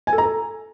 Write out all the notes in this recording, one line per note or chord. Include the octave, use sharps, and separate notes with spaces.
G#5
A4
A#5
A4